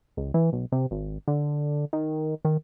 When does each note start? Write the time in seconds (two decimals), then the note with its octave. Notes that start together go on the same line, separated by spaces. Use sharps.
0.17 C#2
0.34 E3
0.52 B1
0.72 C3
0.91 G#1
1.28 D3
1.93 D#3
2.45 D#3